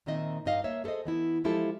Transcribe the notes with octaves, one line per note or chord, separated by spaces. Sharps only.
A#2 D#3 C4 D#4 D#5 E5
G2 D#4 D#5 F5
A#3 C#5 E5
G#4 A4 B4 C5 D#5
E3 B3 E4
F3 G#3 E4 F4 G4 A4